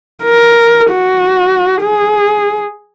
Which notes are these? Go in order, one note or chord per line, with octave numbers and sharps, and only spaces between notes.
A#4
F#4
G#4